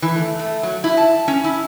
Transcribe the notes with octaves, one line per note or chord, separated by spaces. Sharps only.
E3
A3
A3
F#3
E4
A5
C#4
E4